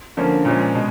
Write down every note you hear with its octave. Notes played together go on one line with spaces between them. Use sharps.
D3 F3 A#3 C#4
A#2 F3 G#3 C#4
B2 G#3